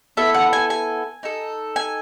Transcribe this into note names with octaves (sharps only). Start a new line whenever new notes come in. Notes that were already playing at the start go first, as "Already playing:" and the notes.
B3 E4 A4 E5
F#5
G#5
G#5
D#4 A4
G#5